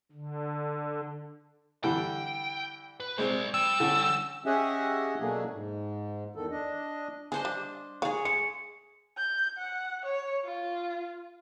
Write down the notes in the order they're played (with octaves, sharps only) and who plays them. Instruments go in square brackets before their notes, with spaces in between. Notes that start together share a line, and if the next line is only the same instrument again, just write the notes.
[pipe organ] D3
[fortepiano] D3 E3 G3 [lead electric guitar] G5
[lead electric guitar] B4
[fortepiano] G#3 C4 [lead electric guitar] C5 D5
[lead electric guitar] G3 [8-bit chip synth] E6
[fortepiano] D3 C#4
[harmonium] C#4 G4 G#4 D#5 E5 F#5
B2 F#3 A3 A#3 D4 G#4
G#2
E2 D#3 A4
D4 D#5
[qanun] D4 C5 D#5 [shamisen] G#4
[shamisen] G3
[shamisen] D#3 F5 [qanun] G#4 C#5
[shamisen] G#3 [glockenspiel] C#7
[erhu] G6
F#5
C#5
F4